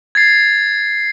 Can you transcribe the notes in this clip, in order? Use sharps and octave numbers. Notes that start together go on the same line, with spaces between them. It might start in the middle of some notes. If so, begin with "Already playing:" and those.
G#6 A6 C7